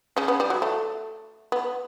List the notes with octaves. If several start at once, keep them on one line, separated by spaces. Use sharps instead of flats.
C#3 C#4
B3
G3
F#3
A3
B3